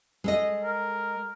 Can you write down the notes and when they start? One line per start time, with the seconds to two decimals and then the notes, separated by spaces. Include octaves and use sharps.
0.24 G#3 A4 D#5
0.64 A#4